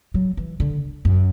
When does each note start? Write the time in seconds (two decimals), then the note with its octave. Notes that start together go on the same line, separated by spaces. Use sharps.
0.14 F#3
0.37 E3
0.60 D3
1.05 F#2